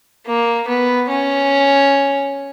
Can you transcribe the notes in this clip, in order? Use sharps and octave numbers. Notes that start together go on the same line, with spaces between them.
A#3
B3
C#4